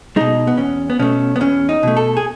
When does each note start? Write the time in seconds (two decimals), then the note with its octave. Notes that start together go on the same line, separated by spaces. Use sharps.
0.16 B2 G#3 D#4
0.47 B3
0.57 E2 C#4
0.90 B3
0.99 B2 A3 C#4
1.36 B3
1.41 E2 C#4
1.69 D#4
1.83 B2 A3
1.97 A4
2.17 G#4